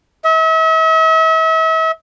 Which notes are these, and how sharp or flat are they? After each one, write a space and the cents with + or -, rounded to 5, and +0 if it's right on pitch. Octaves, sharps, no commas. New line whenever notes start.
E5 -40